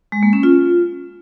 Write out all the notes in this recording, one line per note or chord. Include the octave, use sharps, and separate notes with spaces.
G#3
A#3
C#4
F4